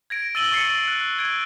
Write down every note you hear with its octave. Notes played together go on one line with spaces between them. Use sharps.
G#6 A#6 D7
E6 A6 D#7 F#7 G7
C#6 A6 C7 C#7 D#7
F#6
G#6 D7